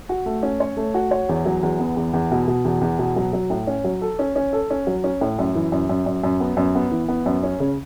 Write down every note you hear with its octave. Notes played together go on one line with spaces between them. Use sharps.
F#4
A3
C#4
C#5
A3
F#4
C#5
E2
F#3
E2
B3
E2
E2
B2
B2
E2
E2
B2
F#3
F#3
A2
C#4
F#3
A4
C#4
C#4
A4
C#4
F#3
C#4
A2
F#2
E3
F#2
F#2
F#2
F#2
B3
F#2
B3
E3
B3
F#2
C#4
C#3